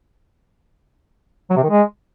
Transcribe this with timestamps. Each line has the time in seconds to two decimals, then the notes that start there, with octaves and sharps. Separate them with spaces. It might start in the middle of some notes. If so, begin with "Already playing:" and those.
1.50 F#3
1.57 C3
1.63 D#3
1.70 G#3